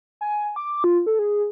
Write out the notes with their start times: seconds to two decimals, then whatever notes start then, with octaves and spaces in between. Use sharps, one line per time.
0.21 G#5
0.56 D6
0.84 F4
1.06 A4
1.19 G#4